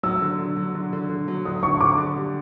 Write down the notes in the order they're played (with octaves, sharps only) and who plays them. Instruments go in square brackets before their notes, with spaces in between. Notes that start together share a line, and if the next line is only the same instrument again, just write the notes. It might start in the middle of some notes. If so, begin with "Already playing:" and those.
[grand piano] F#3 [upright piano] E6
[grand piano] D3
D3
F#3
D3
D3
D3
F#3
[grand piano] D3 [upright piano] D#6
[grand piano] D3 [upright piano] C#6
[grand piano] D3 [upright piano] D6
[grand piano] D3
G3